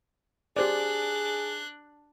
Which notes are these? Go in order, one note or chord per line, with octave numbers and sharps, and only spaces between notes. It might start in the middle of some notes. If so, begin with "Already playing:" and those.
D4 G4 G#4 C5 D5 F#6